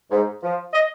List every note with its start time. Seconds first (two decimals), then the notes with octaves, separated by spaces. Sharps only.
0.11 G#2
0.43 F3
0.73 D#5